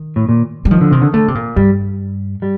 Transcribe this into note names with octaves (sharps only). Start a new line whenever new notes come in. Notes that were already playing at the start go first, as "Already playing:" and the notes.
Already playing: D#3
A2
A#2
G3
D#3 F3
D3
C3 D#3
D3
D3 A3
C3
A#2
G2 G3
G3